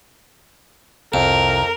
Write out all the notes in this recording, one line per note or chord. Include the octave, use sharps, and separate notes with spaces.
C2 F2 A#4